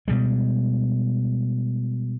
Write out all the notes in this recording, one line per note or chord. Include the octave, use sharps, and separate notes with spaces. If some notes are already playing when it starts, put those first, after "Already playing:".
B2 G3 G#3